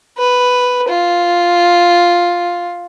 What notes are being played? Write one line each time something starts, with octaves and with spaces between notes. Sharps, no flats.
B4
F4